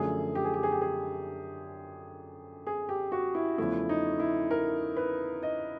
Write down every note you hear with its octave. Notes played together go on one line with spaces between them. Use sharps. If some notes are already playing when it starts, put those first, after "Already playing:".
Already playing: F#2 D3 F3 A3 G#4
G4
G#4
G4
G#4
G4
G#4
G#4
G4
F#4
E4
E2 C#3 F3 A3 E4
D#4
E4
A#4
B4
D#5